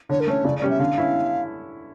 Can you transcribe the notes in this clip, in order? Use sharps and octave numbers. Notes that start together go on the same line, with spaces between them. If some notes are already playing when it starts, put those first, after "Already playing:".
D3 C#5
A#4
A3 C#4 C#5
C#3 D5
G3 C#4 D5
E5
D3 F5
C#4 E4